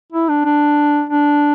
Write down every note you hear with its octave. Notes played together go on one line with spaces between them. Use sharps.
E4
D4
D4
D4